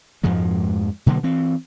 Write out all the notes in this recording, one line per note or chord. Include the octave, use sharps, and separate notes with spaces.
F2 G#2 F3 G#3
B2 D3 F#3 A#3
E3 C4